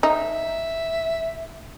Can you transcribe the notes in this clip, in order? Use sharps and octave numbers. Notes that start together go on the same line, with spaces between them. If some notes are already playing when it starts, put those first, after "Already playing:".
D#4 E5